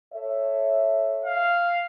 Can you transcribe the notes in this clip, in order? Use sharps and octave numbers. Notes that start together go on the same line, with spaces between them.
A4 C#5 E5
F5